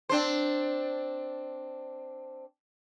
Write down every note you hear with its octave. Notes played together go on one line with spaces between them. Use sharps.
C4 D4 C5